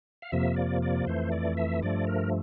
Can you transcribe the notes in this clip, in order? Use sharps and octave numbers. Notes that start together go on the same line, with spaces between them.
F5
F2 C3 F3 A#3 E5
D5
D5
F2 E3 A3 C5
D5
E5
G2 F3 A3 D5
A#4